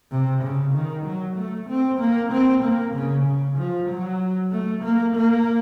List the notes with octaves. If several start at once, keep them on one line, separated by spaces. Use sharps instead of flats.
C3
C#3
D#3
F#3
A3
C4
A#3
C4
A#3
C#3
C#3
F3
F#3
A3
A#3
A#3